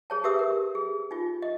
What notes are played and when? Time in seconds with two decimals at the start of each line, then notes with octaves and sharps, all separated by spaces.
0.10 G#4 C#5 A5
0.24 G4 B4 E5 D#6 E6
0.39 A#4
0.75 G#4
1.11 D#4 F4
1.42 D#5